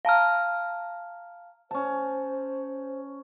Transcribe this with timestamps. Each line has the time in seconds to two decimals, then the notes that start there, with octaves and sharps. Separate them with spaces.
0.05 F5 A5 A#5 F6
1.71 C#4 C5 A5